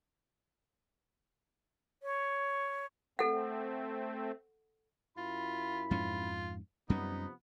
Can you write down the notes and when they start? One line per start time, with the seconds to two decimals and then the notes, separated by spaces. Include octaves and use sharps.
2.03 C#5
3.19 A3 C4 A4 F#5
5.17 F#2 E4 F4 B5
5.91 F2 G#2 C#4 F4
6.90 F#2 C3 F3 G3 B3 C#4 D#4